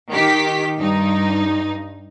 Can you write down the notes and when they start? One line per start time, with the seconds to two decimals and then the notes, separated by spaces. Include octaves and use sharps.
0.11 D#3 G4 B6
0.79 G2 D#4